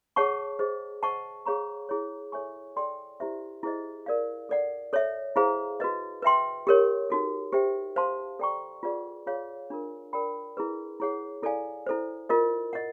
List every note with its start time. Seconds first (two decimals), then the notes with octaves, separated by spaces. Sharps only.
0.16 G#4 C#5 F#5 A5 C#6
0.59 G#4 C5 D#5
1.03 C5 D#5 F#5 A5 C#6
1.46 G#4 C#5 F5 A#5 C#6
1.89 E4 G#4 C#5
2.32 A4 C#5 E5 G#5 C#6
2.76 A4 D5 G5 C6
3.20 E4 G4 C5 E5
3.63 E4 G#4 C5 D#5
4.06 A#4 D5 F5
4.49 A4 D5 F#5
4.93 A4 C#5 E5
5.36 E4 G#4 C5 F5 A#5
5.80 F#4 B4 D#5
6.22 B4 E5 G5 C6
6.67 G4 A#4 C#5
7.10 D#4 F#4 A4
7.53 G4 C5 E5 G5
7.96 C5 F5 A5 C6
8.39 A4 D5 G5 A#5 C#6
8.83 F4 G#4 B4 D5 F#5
9.27 F4 G#4 C#5 F5
9.70 D4 F4 A#4
10.13 A#4 D5 G5 B5
10.57 E4 G#4 B4
11.00 E4 G#4 C#5 F#5
11.42 E4 A4 D5 F5 G#5
11.87 E4 A4 C5
12.29 F4 A#4 D#5
12.73 D#5 F#5